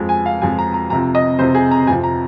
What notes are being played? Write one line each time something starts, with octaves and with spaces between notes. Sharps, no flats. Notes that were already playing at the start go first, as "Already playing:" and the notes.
Already playing: F2 F3 G#3
G#5
F5
F2 F3 G#3 G#5
A#5
A#5
F2 C3 F3 A#5
D#5
F2 C3 F3 C5
G#4
A#5
F2 C3 F3 G#5
A#5